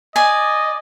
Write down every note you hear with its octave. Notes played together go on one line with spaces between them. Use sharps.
D5 D#5 G#5